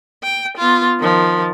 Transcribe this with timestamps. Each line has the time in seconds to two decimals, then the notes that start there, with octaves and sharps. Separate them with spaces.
0.23 G5
0.57 B3 F4
1.00 D#3 F3